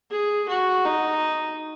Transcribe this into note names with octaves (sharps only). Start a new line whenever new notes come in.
G#4
F#4
D#4